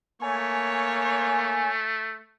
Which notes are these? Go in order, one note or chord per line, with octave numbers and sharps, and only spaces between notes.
A3 A#3 C#5 G#5